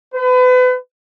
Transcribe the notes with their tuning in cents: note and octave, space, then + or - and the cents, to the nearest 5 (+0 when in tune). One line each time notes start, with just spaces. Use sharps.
B4 +35